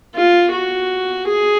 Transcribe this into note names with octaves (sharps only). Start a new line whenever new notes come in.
F4
F#4
G#4